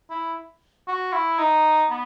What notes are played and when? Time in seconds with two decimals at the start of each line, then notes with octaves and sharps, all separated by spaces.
0.10 E4
0.88 F#4
1.13 E4
1.39 D#4
1.90 B3